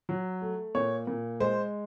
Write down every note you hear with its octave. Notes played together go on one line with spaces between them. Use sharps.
F#3
A3
A#2 C#5
A#2
G#3 C5